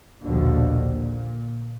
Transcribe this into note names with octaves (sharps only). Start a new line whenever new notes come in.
A#1 D#2 B2 D3 F3
A#2